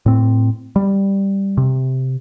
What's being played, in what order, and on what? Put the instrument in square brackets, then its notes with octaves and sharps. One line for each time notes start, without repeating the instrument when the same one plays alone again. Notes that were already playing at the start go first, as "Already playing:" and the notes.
[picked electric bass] A2 C4
G3
C3